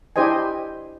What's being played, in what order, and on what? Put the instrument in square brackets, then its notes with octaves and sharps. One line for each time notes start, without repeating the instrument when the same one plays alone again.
[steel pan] D4 E4 G4 C5 D#5 G#5